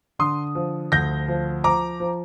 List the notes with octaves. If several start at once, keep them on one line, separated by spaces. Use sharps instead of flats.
D3 C6 D#6
F3
D2 G6 A#6
F3
F3 A#5 D6
F3